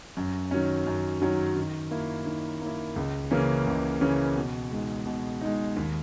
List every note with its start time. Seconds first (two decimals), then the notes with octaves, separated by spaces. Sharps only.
0.17 F#2
0.51 D#3 F#3 C#4
0.87 F#2
1.22 D#3 F#3 C#4
1.57 D#3
1.91 A#3 E4
2.26 D#3
2.61 A#3 E4
2.96 C#2
3.31 C#3 E3 A#3 C#4
3.67 C#2
4.01 C#3 E3 A#3 C#4
4.36 B2
4.71 G#3 D#4
5.06 B2
5.41 G#3 D#4
5.77 D#2